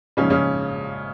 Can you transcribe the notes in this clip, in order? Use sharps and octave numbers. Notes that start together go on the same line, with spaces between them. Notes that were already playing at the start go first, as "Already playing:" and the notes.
A#1 G#2 C#3 F3 C#4
C#3 C#4